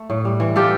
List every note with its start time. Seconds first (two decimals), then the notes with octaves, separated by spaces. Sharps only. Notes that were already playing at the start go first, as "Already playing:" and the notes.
Already playing: A3
0.10 A2
0.25 G3
0.40 E3
0.56 F4 G4 A4